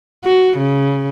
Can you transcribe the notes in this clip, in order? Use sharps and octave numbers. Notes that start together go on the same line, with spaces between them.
F#4
C#3